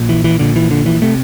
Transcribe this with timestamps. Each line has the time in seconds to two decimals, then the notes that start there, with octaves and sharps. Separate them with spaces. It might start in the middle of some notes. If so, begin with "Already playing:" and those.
Already playing: A#1 A#2
0.09 E3
0.24 E3
0.39 A#1 A#2 D3
0.56 E3
0.71 D3
0.86 E3
1.02 C3 A3